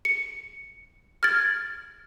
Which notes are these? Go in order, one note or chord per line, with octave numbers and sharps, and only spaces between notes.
C#7
F6 G#6 A6